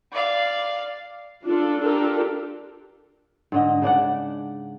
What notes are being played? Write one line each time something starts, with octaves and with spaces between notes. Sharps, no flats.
D5 F5
D4 F4 A4
D4 F4 G4 A4 A#4
G#2 D3 D#5
C#3 D4 D5 F#5